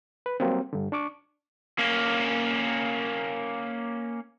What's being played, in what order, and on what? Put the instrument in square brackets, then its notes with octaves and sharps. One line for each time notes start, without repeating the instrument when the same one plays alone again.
[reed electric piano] B4
F#3 G3 A#3 C4
G2 D3
D4 C#6 D6
[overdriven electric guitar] A#3 C#4